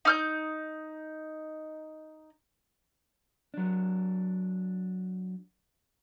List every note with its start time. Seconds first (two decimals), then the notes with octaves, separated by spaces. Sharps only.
0.05 D#4 F6 G6
3.54 F#3 D4